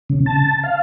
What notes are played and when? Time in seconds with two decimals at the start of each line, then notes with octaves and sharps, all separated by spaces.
0.10 C#3
0.26 A5
0.63 F5